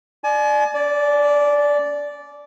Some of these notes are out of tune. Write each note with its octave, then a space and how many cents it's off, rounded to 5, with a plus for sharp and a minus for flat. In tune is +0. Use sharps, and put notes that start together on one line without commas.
D5 +20 G#5 +40
C#4 +35 D5 -10